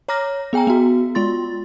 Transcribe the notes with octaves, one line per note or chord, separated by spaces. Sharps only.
C#5 A#5 D6 F6 A#6
B3 G#4 G5 G#5 A#5
B3 F#4
G#3 F4 C6 A6